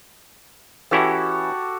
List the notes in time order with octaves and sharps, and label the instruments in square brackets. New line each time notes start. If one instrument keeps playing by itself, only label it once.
[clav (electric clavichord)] E3 C#4 E4 [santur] F#4 G4 A4